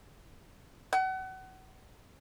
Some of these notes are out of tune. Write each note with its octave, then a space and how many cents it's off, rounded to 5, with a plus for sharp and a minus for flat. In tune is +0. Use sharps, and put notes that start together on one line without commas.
F#5 +30